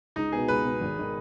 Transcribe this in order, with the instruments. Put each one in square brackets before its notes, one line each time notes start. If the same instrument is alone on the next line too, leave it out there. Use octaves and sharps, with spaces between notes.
[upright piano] C#2 [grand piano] D#4
[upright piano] B2 B3 [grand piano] G#4
[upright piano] C#2 [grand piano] B4
[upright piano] B2 B3
G#1
D#3